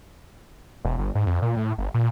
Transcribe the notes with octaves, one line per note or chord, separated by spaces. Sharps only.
E1
G1
G#2
F2
A#2
A2
G1
A#2